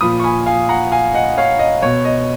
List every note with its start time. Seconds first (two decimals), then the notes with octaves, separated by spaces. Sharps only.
0.01 A#2 F3 B5 D#6
0.20 C#6
0.24 G#5 B5
0.46 F5 G#5
0.69 F#5 A#5
0.92 F5 G#5
1.14 D#5 F#5
1.38 C#5 F5
1.59 D#5
1.82 B2 C#5
2.05 D#5